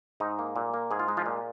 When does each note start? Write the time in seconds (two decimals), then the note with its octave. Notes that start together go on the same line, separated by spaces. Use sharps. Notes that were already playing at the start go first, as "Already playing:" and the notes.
0.20 G#2 D#4
0.39 A#3
0.56 A#2
0.74 A#3
0.91 G#2 G#4
0.99 F4
1.08 G#3 D#4
1.17 F3 F4
1.26 A#2